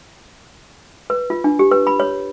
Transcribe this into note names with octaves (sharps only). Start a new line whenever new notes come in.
B4
F4
D4
G4
B4
B5
C#5